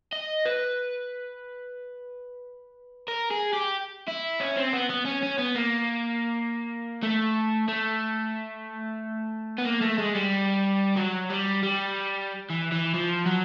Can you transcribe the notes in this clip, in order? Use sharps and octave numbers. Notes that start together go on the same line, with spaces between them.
D#5
B4
A#4
G#4
G4
E4
C#4
C4
B3
B3
C#4
C#4
B3
A#3
A3
A3
B3
A#3
A3
G#3
G3
F#3
G3
G3
E3
E3
F3
F#3